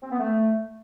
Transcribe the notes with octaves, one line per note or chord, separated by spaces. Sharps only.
C4
B3
A3